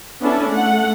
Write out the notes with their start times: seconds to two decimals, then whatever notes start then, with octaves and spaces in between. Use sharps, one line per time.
0.21 B3 C#4 D4 E4 A4
0.51 A3 F#5